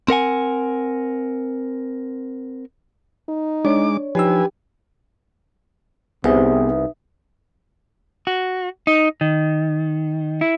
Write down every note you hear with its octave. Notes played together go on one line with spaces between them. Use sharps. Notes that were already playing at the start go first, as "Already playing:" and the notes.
C4 A#4 F#5 G#5
D#4
G#3 D4 C#5 D6
F3 D#4 G4 B4 G#5 E6
C2 C3 B3 D#4 G#4 B4 E5
F#4
D#4
D#3
E4